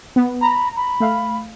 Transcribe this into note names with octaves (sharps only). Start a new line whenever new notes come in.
B3
A#5 B5
B5
A3 F5